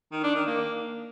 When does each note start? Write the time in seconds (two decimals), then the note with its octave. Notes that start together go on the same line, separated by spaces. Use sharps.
0.12 D#3
0.24 D4
0.35 D#3
0.46 A#3